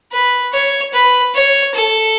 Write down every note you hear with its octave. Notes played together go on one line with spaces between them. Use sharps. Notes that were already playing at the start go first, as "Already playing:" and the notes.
B4
C#5
B4
C#5
A4